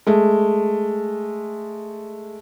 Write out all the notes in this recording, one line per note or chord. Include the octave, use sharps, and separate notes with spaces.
G#3 A3